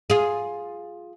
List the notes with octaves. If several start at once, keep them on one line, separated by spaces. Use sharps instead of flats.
F4 G#4